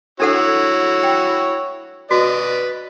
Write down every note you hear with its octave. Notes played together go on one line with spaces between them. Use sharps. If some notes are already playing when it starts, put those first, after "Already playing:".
D4 E4 F#4 A4 C#5 F#5
G5
F#4 B4 D5 D#5